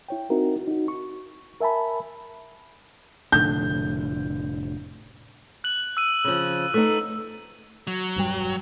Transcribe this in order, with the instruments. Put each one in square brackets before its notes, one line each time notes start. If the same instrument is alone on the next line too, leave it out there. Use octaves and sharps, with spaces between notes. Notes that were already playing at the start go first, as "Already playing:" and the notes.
[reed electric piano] E4 C#5 G5
C4 D#4 E4 F#4 A#4
D#4 F#4
C#6
A#4 E5 G#5 A5 B5
[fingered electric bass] F1 A2 D3 [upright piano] G6
[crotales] F#6 F#7
E6 D#7
[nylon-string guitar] C#3 F3
[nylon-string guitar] A3 B3 D#4 [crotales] E6
[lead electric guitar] F#3
[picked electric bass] E1 G2 G3